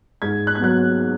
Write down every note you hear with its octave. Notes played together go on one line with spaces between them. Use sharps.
G#2 G#6
F#6
G#6
F#3 B3 F#6